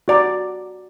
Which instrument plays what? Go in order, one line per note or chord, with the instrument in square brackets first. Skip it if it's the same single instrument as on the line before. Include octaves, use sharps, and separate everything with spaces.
[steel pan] F#4 D5 A#5